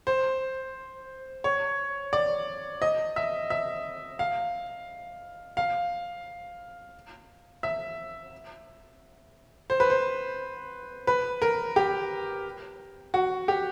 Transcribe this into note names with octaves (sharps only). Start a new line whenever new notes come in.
C5
C#5
D5
D#5
E5
E5
F5
F5
E5
C5
B4
C5
B4
A#4
G4
F#4
G4